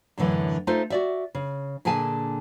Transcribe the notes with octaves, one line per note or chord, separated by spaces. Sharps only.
F#2 A2 D3 E3
A3 D#4 F4 A4 C5
F#4 D5 E5
C#3
A#2 D3 G#4 G#5 A5